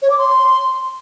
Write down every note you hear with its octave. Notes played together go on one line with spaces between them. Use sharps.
C#5
D6
C6